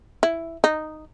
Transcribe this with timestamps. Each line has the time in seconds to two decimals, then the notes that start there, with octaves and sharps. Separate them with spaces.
0.23 E4
0.64 D#4